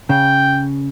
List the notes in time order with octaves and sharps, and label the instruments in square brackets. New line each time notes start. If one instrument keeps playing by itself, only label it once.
[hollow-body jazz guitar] C#3 [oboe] G5